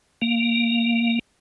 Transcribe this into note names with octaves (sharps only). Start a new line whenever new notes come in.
A#3